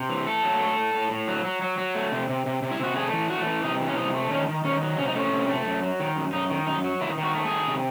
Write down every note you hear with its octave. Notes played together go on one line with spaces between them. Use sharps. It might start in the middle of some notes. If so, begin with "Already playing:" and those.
Already playing: C3
E3
A3 A4
F#3
A3
A2
A2
A2
F#3
F#3
F#3
F#3
A3
C3
C3
C3
C3
E4
C3 F#4
A3 G#4
E3
A3 F#4
E3
C3 D#4
E3
C#4
C3 D#4
A3
D#3 C#4
D#3
D#3 C#4
F#3
C3 C#4
D#4
A3 C#4
C3
A3
F#2
F#3
D#3
F#2
F#2 D#4
D#3
F#2 D#4
F#3
D#3 E4
D#3
F#4
A3
G#4
D#3
C3